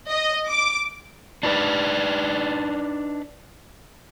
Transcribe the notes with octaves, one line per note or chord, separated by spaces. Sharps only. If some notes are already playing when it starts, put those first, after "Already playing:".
D#5
D6
D4 D#4 B4 D5